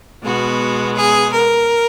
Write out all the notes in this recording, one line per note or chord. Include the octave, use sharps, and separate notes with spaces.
B2 G#3 B3 F#4
G#4
A#4